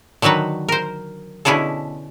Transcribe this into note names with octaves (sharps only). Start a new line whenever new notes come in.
D3 D#3 F#3 F#4 B4
A#4 C5
B2 D3 C#4 E4 G#4 A4